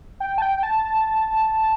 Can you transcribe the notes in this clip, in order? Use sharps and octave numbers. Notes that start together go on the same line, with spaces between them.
G5
A5
G5
G5
A5
A5